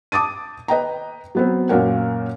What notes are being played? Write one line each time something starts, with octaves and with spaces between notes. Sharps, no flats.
A5 D6 D#6 A6 D#7
B4 D#5 G5 A#5
F#3 B3 C4
F#2 A#2 C#4 A#4 F#5